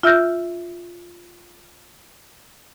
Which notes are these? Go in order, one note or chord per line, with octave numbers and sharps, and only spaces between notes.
F4 E5 E6 F6 G6 A#6